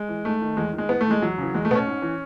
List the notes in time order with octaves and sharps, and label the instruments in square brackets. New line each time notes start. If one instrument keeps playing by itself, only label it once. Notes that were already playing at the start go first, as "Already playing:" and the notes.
Already playing: [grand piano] G#3
E3
G#2 A3
D#3
E2 G#3
D#3
G#3
A2 B3
A3
E3 G#3
E2 F#3
C#3 E3
E2 G#3
A3
B2 B3
C#4
G#2
E3